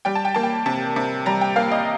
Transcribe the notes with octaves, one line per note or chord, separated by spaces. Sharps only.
G3 G5
A5
G5
A#3 A5
G5
C3 A5
C3
G3 A#5
G5
A#3 F5
D#5